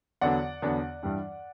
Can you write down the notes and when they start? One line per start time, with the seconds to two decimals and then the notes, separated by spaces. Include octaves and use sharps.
0.21 E2 D3 F#3 B3 D4 D5 F#5
0.62 E2 D3 F#3 B3 D4
1.03 G2 E3 G3 D4